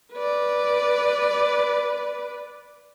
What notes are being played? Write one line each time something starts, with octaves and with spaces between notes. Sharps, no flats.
B4 D5